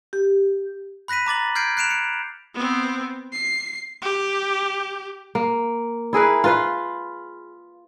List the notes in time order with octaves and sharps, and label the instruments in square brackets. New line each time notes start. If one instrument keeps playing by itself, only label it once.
[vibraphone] G4
[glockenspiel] B5 F#6 A#6 B6 D#7
A#5 D6 A6 F#7
F6 G6 G#6 C7 D7
F#6 C7 D7 E7 F7
C#7
[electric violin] B3 C4
C7
G4
[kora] A#3
E4 G#4 A#4 B4
F4 B4 F5